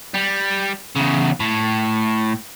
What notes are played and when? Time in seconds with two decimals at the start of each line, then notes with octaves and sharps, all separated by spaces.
0.14 G3
0.95 E2 C#3
1.40 A2